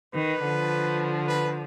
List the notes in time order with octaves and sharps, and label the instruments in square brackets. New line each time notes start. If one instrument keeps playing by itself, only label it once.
[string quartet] D#3 [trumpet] B4
[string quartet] D3 F3
[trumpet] B4